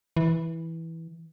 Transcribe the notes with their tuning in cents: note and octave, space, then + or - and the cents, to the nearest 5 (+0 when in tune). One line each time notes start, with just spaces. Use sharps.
E3 -10